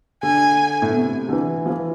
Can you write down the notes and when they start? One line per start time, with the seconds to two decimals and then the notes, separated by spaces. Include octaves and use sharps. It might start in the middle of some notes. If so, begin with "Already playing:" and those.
0.23 D3 G#5
0.82 A2
0.90 B2
0.97 C3
1.29 D3
1.33 E3
1.66 F3
1.70 E3